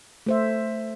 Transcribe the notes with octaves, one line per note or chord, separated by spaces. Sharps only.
A3 C5 E5